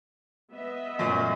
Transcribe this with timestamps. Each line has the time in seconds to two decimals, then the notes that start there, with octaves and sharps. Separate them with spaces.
0.53 B3 D#5 E5
0.99 F#2 A#2 A3